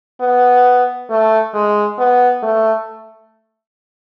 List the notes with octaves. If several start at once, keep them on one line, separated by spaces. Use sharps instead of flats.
B3
A3
G#3
B3
A3